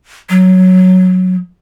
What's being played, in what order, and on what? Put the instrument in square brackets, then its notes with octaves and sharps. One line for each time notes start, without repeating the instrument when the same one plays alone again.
[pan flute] F#3